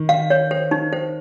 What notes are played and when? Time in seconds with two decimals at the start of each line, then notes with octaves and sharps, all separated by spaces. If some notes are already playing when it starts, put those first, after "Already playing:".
Already playing: D#3
0.09 F5
0.30 C#5
0.51 C5
0.71 D#4
0.93 C5